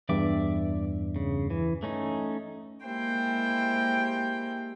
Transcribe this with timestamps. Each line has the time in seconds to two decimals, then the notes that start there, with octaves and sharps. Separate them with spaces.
0.09 E2 G2 D5 E5 D6
1.16 C#3
1.50 E3
1.83 A3 C#4 D#4
2.85 G#3 A#3 E4 G4 C5 G5